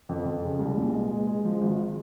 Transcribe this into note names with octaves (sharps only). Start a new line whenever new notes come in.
F2
F2
C#3
C2
A#2
G#3
G#3
G#3
F3
G#1